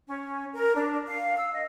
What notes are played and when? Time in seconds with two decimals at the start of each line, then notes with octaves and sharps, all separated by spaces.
0.08 C#4
0.54 A#4
0.74 D4
1.07 F5
1.36 E6
1.52 D#5